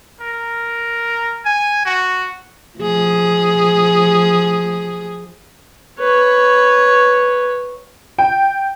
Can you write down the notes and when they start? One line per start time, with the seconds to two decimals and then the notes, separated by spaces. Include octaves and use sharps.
0.21 A#4
1.45 G#5
1.85 F#4
2.79 F3 G#4
5.99 B4 C#5
8.19 G5